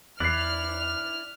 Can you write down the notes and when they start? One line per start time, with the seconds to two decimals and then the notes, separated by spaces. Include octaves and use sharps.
0.20 E2 E4 D5 F6 F#6 C7